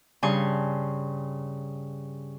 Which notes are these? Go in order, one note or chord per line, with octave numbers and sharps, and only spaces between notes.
G2 C#3 G#5 C6 C#6